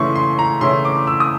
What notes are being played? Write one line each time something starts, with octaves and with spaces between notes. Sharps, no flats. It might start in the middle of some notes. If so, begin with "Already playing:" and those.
Already playing: C#3 E3 A3 C#4 E4 C6 C#6
C6
A#5
C#3 E3 A3 C#4 E4 C6
D6
E6
D#6